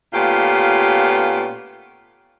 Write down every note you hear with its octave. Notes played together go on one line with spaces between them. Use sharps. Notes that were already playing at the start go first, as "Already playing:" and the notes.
A#2 A3 B3 C#4 F4 G4